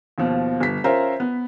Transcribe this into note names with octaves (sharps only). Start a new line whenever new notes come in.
D#2 B2 F3
G1 B6
C#4 F4 A#4 C5 E5 A#5
B3